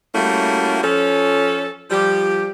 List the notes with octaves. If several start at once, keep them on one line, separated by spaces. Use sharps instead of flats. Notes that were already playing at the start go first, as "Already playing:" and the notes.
G3 A3 A#3 C#4 E4 F#4
F3 C#4 A4
F3 G3 G4